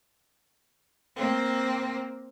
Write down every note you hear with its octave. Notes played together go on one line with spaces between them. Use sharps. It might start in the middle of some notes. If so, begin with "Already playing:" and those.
A#3 C4